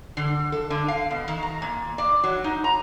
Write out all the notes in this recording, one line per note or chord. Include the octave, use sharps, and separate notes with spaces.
D3
A4
D3
F5
B2
D#3
A#5
A#2
D5
F#3
D#4
A#5